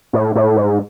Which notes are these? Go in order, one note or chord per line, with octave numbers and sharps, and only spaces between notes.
A2
A2
G#2